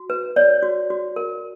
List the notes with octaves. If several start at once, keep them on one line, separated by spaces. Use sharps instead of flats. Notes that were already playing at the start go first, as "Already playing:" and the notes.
Already playing: F#4
B4
C#5 D5
F#4
F#4
A#4